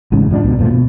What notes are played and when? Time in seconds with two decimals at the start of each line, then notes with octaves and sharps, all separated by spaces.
0.12 A1 G#2 C#3
0.31 G#2 F3 D4
0.43 C#2 B2
0.59 G1 A#2 F3 A3
0.71 B2